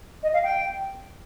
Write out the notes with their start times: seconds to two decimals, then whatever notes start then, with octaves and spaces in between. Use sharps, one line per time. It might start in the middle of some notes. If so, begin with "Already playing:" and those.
0.23 D#5
0.34 F5
0.43 G5